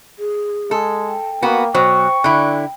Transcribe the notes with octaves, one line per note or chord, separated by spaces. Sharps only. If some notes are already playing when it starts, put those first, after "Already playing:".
G#4
G#3 A4
G5
A#3 B3 F#4
B2 F#3 C5 C#6
D3 E4 B5 F#6